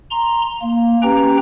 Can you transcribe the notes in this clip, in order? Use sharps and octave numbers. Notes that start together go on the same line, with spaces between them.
A#5 C6
A#3
C#4 G4 B4 G5 A#5